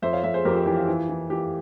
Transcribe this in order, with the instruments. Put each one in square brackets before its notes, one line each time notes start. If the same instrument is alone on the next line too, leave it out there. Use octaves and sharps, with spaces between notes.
[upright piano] F2 C5 E5
C#5 F5
F2 C5 E5
G#4 C5
F2 G4 A#4
G4
E3 G4
F4
E3
E3
E3 G4